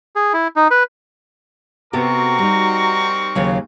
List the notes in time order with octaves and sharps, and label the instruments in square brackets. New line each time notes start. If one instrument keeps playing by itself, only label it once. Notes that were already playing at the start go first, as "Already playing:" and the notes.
[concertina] G#4
E4
D#4
B4
[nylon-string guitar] C3 B3 A4 [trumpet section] C4 A#4 C#6 [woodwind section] F#4 A#5
[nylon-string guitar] G3 D#4
D#2 C#3 F#3